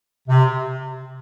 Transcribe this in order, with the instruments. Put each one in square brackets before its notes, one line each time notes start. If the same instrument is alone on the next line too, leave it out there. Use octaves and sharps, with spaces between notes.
[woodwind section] C3